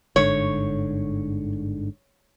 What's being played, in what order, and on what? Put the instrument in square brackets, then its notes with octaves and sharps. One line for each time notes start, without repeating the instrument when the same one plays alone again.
[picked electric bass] G1 G#2 D3 [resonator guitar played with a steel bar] C#5